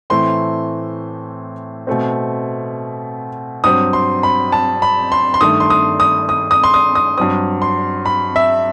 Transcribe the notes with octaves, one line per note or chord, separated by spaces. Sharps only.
A2 E3 A3 C4 C6
B2 A3 C4
G2 F#3 C4 D#6
C6
B5
A5
B5
C6
C6
G2 D#3 A3 D#6
C6
D#6
D#6
D#6
D#6
C6
D#6
D#6
G2 F#3 C4 D#6
C6
B5
E5